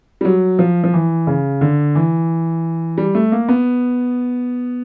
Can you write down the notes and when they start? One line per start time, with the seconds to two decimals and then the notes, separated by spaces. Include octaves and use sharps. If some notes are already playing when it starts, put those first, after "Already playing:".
0.21 G3
0.25 F#3
0.59 F3
0.84 F3
0.94 E3
1.27 C#3
1.61 D3
1.95 E3
2.98 G3
3.15 A3
3.32 A#3
3.49 B3